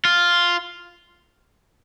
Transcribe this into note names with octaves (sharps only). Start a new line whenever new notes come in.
F4